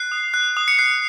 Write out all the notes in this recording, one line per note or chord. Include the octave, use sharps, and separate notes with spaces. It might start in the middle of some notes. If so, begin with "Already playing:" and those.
Already playing: F#6 C7
D#6
F#6
D#6
C#7
F#6 C7